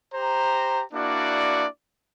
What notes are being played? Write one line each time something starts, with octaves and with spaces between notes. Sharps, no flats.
G4 C5 A#5
A#3 D4 E4 F#4 D5